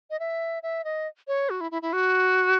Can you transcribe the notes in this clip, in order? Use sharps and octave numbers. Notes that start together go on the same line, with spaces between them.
D#5
E5
E5
D#5
C#5
F#4
E4
E4
E4
F#4